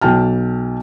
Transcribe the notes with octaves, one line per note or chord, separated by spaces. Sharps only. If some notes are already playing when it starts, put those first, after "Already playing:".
B1 F#3 G5 A5 F6